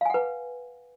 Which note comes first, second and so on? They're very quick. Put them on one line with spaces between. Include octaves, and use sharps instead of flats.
F5 G#5 F#5 B4